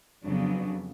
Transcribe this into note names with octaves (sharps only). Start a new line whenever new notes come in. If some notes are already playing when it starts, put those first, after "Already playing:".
F2 C#3 F#3 B3 D4